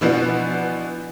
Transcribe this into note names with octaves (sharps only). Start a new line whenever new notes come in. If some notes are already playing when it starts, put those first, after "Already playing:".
B2 E3 F3 B3 D4 F#4